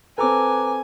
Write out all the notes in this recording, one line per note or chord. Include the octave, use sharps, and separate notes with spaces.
C4 A4 B4 G#5 A#5 D6